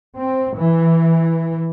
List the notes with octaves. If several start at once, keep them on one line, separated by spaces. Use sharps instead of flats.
C4
E3